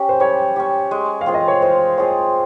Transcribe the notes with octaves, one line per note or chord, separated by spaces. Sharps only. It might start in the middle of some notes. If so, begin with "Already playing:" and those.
Already playing: C#4 G4
C5
G3 C#5
C#4 G4
G#3
F5
C4 F4 G#4
D#5
C#5
G#3 C5
C4 F4 G#4 C#5